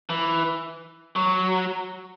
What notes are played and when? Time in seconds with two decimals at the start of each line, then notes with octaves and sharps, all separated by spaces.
0.10 E3
1.16 F#3